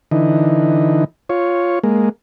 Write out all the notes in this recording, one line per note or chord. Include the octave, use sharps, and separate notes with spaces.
D3 E3 D#4
F4 C#5
G#3 A#3